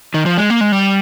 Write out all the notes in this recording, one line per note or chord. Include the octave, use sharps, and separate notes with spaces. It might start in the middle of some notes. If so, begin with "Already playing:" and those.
D#3
F3
G#3
A#3
G#3
G3